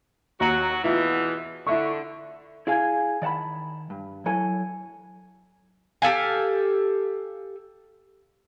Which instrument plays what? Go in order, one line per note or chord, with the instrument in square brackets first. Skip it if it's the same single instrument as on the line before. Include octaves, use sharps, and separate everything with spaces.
[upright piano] D#2 A#5 [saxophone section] F#3 F#4
[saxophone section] E2 B2 E3 [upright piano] E4 F4
[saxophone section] D3 [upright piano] E4 E5 C#6
[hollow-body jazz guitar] E4 G#4 F5 G#5
D#3 D5 F#5 A5 B5
G2
F#3 E4 A4 G#5
[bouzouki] G4 A4 F5 G#5